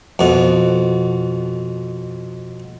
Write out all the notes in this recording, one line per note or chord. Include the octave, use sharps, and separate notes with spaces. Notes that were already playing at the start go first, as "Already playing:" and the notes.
F2 B2